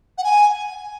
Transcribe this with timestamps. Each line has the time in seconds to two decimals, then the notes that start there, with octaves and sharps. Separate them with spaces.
0.18 F#5
0.24 G#5